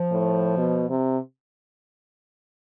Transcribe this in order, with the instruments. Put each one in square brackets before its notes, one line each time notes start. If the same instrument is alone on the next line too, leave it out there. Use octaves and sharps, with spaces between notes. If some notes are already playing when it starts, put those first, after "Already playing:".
Already playing: [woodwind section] F3
[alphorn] A2
B2
C3